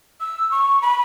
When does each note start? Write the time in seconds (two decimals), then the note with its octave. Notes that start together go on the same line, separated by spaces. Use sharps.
0.20 E6
0.51 C#6
0.82 B5